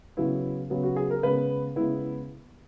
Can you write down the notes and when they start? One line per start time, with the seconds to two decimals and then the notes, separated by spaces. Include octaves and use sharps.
0.17 C#3 F#3 B3 E4
0.70 C#3 F#3 B3
0.83 F#4
0.96 G#4
1.10 A#4
1.23 C#3 G#3 B3 B4
1.76 C#3 G#3 B3 E4